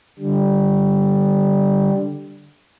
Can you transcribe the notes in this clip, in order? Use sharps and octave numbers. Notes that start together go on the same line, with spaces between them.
D3 G3